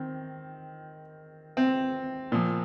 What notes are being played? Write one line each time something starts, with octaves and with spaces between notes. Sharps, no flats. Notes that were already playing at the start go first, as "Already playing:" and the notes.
Already playing: D#3 C4
C4
A#2 F3